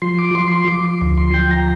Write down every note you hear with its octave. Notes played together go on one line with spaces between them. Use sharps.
F3 C6
D6
F3 C6
C6
F3 D6
D2
C6
F3 G5
A#5